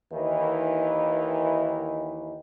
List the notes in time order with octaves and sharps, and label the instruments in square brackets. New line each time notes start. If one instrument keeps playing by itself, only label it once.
[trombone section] D#2 D#3 E3